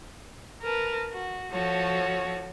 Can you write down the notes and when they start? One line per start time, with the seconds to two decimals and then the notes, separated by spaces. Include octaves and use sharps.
0.64 A#4 B4 A5
1.11 F#4
1.52 F3 F#4 A4 C#5